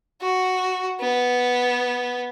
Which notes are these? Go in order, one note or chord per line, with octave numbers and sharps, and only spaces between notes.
F#4
B3